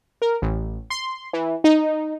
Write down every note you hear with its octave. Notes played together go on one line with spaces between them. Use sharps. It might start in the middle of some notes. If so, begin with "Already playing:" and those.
A#4
A1
C6
E3
D#4